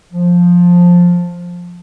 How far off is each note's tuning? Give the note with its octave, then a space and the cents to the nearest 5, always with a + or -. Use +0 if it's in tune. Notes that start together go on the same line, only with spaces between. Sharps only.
F3 +10